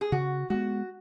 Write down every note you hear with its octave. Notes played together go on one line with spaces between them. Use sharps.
G#4
C#3 F#4
G#3 B3 F#4